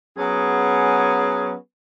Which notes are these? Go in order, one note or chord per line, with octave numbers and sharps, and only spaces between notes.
F#3 B3 C#4 G#4